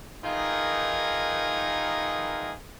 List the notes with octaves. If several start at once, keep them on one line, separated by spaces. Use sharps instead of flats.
D#3 E3 D#4 F4 G#4 A#4